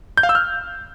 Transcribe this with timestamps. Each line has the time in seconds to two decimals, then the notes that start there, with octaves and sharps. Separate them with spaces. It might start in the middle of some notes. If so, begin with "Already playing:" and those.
0.17 G6
0.23 F5
0.29 E6
0.35 F6